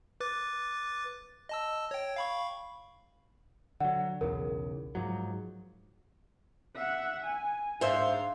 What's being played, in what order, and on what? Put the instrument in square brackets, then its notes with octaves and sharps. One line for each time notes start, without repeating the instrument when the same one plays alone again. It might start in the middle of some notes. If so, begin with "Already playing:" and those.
[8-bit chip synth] B4 D6 A6
D#5 A5 E6
C#5 G5
F5 B5 C#6
[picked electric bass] D3 F#3 [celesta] F#5
[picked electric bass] B1 E2 C#3 [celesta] A#4
[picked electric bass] G#2 F3 F#3
[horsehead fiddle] E5 F#5
G#5
[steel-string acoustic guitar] G#2 C5 E5 [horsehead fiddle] D4 F5